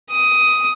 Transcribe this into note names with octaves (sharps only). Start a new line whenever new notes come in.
D#6